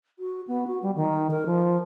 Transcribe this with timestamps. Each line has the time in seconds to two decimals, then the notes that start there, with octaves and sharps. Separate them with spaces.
0.19 F#4
0.48 B3
0.67 F#4
0.83 G3
0.96 D#3
1.31 A#4
1.46 F3